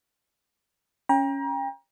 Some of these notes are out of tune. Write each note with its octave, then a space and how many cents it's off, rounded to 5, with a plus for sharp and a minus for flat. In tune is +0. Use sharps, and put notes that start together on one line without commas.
C#4 +0 G5 +30 A#5 +30